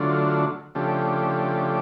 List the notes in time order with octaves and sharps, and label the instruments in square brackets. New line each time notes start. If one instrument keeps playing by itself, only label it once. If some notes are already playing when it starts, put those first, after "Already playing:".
Already playing: [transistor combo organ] D3 F#3 A3 D4 F4
C#3 F3 A3 D4 G4